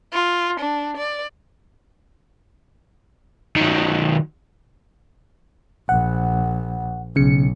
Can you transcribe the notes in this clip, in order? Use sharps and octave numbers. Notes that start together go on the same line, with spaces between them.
F4
D4
D5
D#3 F#3
A#1 F#5
B1 C#3 C#7